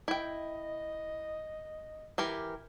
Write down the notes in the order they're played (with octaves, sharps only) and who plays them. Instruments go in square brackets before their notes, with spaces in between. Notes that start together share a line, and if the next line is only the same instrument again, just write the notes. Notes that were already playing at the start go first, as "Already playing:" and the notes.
[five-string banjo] E4 G5 [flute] D#5
[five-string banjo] E3 G4 A#4